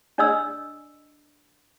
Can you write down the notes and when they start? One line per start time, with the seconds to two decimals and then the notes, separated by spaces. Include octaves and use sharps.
0.18 D4 D5 D#5 D#6 E6